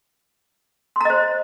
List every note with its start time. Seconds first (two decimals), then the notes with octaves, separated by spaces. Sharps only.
0.96 C6
1.01 A#5
1.05 D#5
1.10 C5